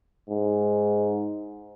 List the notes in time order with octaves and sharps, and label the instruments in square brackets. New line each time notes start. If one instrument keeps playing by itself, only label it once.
[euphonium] G#2